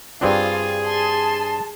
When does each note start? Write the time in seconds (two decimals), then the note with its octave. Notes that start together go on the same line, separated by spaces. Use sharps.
0.21 G2 C4 D4 F4 G#4
0.85 A5 C6